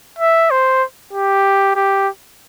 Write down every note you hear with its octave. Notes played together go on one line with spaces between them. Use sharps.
E5
C5
G4
G4